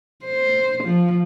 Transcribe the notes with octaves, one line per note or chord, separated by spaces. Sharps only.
C5
F3